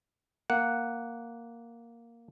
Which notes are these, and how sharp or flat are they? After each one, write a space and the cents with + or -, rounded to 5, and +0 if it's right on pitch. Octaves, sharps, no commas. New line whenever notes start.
A#3 +0 F#5 +0